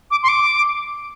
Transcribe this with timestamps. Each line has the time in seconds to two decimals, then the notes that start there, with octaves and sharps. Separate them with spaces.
0.11 D6
0.23 C6
0.28 D6